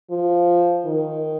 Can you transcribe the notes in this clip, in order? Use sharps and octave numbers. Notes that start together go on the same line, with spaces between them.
F3
D#3